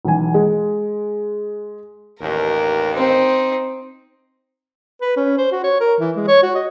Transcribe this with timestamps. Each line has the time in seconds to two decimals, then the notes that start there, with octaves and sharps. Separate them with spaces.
0.05 B1 E3 G#5
0.34 G#3
2.20 A1 D#2 A#4
2.96 C4 D#4
5.01 B4
5.16 C#4
5.38 C5
5.52 F#4
5.64 C#5
5.80 A#4
6.00 E3
6.17 G#3
6.28 C#5
6.43 F#4
6.55 D#5